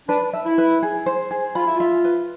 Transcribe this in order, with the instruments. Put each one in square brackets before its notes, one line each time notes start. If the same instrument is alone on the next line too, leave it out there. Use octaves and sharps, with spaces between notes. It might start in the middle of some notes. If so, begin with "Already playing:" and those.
[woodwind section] D4 [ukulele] B4
[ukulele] E5
[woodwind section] E4
[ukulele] B4
G#4
C5
G#4
[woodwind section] F4 [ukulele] B5
[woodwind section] E4
[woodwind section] F4 [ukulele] E5
[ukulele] B4